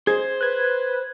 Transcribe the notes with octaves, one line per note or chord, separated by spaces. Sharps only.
G#4 C5 G#6
B4 F#6 G#6